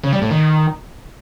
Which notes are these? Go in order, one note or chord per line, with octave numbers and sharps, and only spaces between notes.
C#3
G3
A2
D#3